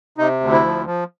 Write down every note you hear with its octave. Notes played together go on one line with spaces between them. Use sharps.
C3 D#4
D2
E4
F3
F3